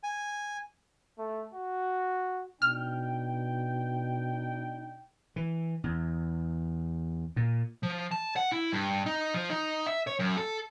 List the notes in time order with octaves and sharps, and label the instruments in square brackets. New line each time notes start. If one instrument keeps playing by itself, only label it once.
[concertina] G#5
[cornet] A3
F#4
[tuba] B2 [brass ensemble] D4 D#4 G5 [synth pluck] F6
[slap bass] E3
E2
A#2
[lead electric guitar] F3
A5
F#5
E4
G2
D#4
F3
D#4
E5
C#5
F#2
A4